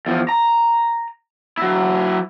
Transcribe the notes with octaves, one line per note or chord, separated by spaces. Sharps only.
E2 F3
A#5
F#3 E4